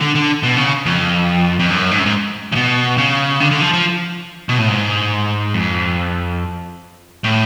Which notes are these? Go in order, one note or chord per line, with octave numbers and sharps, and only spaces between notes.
D3
D3
B2
C#3
F2
F2
F#2
G#2
F#2
G#2
C#3
B2
C#3
D3
D3
F3
F3
B2
A2
G#2
F2
A2